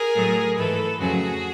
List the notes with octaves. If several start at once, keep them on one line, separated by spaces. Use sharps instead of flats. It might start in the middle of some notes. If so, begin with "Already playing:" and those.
Already playing: G#4 A#4
A2 F#3 A3
G#2 E3 A3 A4 B4
F2 C#3 F#3 A3 F#4 G#4